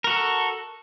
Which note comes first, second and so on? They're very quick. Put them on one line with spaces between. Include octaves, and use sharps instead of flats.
A#4 F#4 A4